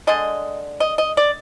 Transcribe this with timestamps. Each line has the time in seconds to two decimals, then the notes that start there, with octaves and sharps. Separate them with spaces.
0.07 D3 G#3 D#5
0.80 D#5
0.98 D#5
1.17 D5